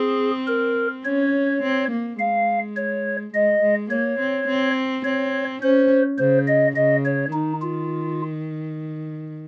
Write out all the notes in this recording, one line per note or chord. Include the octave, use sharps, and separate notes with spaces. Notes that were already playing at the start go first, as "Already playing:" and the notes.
Already playing: C4 G#4
A#4
C#4 C#5
C4
A#3
G#3 F5
C#5
G#3 D#5
G#3
A#3 C#5
C4
C4
C4 C#5
C#4 C5
C#3 C5
D#5
C#3 D#5
C#5
D#3 D#4
F4